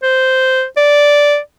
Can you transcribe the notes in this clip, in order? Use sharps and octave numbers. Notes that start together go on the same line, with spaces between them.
C5
D5